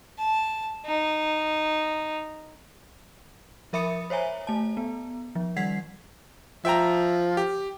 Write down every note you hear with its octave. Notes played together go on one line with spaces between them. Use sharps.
A5
D#4
F3 A#4 E5 B5 D#6 C#7
C5 C#5 E5 G#5 A#5
A3 A5
B3
F3
D#3 G3 F#5 G#6 B6 C7
F3 E5 G5 A#5
G4